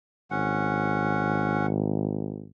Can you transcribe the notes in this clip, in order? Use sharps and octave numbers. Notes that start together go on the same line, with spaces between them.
G#1 C#4 F#5